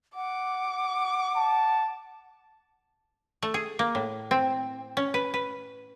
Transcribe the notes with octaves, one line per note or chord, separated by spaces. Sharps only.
F#5 D6
A5
A3
G#4
A#3
A2
C4
C#4
B4
B4